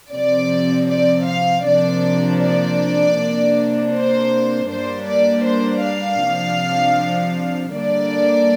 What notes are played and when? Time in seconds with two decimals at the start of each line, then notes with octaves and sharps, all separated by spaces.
0.12 C3 F3 C4 D5
0.88 D5
1.26 F5
1.64 C3 F3 A#3 D4 D5
2.40 D5
3.17 C3 A#3 D4
3.93 C5
4.69 G2 G3 A#3 D4 C5
5.06 D5
5.45 C5
5.83 F5
6.21 C3 F3 D4
7.72 D3 G3 A#3 D4 D5